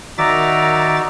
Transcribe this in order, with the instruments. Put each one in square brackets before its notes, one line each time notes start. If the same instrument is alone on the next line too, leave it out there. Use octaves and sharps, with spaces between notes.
[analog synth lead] D#3 [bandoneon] D#4 F#4 D5 [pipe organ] E5 D6 A6 [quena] A#5